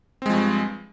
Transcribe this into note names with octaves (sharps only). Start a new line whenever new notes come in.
G2 F3 G#3 C4